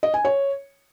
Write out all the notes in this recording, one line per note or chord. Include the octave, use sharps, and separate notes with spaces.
D#5
G#5
C#5